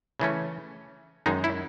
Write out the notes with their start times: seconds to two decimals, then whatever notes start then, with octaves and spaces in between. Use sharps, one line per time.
0.20 C#3 E3 A3 C#4
1.26 F#2 D#3 G#3 D#4
1.44 E4